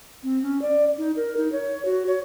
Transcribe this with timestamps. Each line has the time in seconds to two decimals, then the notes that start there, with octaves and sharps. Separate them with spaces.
0.23 C4
0.42 C#4
0.62 D5
0.98 D#4
1.16 A#4
1.37 D#4
1.52 C#5
1.85 F#4
2.07 C#5